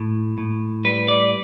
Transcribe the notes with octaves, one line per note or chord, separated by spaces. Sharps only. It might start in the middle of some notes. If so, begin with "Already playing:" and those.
Already playing: A2
A2
G3 B4
D5